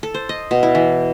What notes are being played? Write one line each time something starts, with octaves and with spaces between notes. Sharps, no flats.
A4
C5
D#5
B2
E4
E3